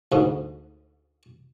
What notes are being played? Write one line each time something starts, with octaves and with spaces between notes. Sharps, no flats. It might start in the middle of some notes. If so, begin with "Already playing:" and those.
D2 G#2